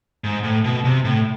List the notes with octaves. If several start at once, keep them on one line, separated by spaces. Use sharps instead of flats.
G#2
A2
B2
C3
A2